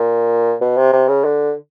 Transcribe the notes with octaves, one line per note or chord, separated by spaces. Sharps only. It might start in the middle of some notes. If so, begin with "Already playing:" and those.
Already playing: A#2
B2
C3
C3
C#3
D3